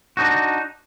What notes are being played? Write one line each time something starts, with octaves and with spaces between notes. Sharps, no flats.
D4 D#4 F#4